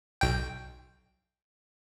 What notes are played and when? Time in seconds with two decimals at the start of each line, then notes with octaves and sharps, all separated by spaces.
0.21 B1 G5